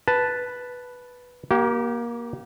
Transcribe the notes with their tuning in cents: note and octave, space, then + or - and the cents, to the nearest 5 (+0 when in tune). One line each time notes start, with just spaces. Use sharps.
B4 +0 A5 +0
A#3 +20 G4 -30